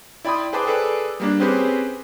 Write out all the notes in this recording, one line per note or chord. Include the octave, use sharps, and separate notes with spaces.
E4 D5 G5 B5 C6 D#6
G#4 B4 C5 G5 A5 D6
G#4 A4 B4 D5
G3 A#3 D4
C4 C#4 G4 G#4 B4 C5